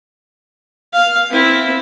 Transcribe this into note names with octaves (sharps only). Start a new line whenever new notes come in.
F5
C4 E4